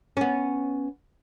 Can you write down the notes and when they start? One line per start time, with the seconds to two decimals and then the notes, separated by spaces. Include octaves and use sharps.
0.17 B3 C#4